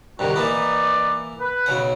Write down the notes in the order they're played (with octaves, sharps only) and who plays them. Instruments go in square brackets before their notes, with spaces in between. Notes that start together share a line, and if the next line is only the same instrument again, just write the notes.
[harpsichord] G2 C3 D#3 [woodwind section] F#4
[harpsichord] E3 A#3 E4 [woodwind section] D#4 B4 D5
[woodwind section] B4
[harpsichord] B1 C#3 F#5